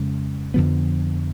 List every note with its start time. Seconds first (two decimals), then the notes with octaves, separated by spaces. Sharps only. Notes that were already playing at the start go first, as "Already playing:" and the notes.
Already playing: F2 C#3 G#3
0.54 F2 D3 F3 B3